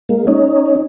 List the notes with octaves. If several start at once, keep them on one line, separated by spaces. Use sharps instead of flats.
G#3 A#3
C#4 D#4